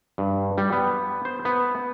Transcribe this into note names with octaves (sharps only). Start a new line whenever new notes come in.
G2
G3
B3
C5
B3